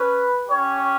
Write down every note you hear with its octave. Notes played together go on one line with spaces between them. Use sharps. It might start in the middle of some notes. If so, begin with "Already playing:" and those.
Already playing: C#4 B4
C#4 G4 C#5